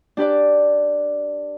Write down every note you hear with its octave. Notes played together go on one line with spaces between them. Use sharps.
D4 G4 B4 D5